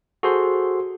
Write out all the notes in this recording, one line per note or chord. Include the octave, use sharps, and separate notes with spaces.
F#4 G#4 A4 C5 C6